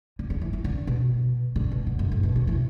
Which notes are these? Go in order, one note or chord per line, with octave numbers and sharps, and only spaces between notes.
D3
D3
E3
E3
D3
B2
D3
B2
D3
F#2
A2
B2
D3
E3